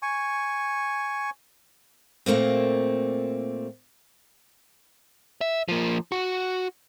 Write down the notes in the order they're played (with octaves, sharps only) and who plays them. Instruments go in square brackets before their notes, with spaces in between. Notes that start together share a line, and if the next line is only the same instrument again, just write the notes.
[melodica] G#5 C#6
[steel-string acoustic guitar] A#2 A3 A#3 C4
[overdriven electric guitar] E5
F3 A#3
F#4